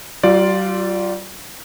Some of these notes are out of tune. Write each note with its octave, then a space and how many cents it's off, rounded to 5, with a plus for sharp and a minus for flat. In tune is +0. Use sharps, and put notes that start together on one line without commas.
G3 -45 F4 +0 D5 +0